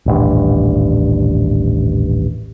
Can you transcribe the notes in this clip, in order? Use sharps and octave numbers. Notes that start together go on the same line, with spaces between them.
D#1 A1 G2